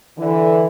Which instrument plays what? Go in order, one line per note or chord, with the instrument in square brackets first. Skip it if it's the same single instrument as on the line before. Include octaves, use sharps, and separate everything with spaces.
[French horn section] D3 E3